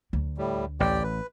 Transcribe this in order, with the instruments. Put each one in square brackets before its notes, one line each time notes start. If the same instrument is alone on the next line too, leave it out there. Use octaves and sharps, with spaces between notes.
[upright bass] D2
[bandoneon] A2 G3
[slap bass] A1 [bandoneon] G4 D5 G5
[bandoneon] B4